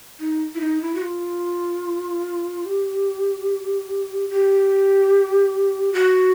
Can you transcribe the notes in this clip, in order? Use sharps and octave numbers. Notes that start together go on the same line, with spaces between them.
D#4
E4
D#4
E4
F#4
F4
G4
G4
F#4